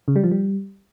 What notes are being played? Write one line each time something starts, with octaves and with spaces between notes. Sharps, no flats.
C#3
G3
F3
G3